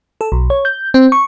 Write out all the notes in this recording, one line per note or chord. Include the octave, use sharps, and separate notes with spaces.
A4
B1
C#5
G6
C4
C#6